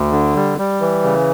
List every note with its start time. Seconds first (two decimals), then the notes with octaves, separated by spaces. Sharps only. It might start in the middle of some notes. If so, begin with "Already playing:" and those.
Already playing: D2
0.12 D3
0.36 G3
0.58 G3
0.81 E3
1.04 C#3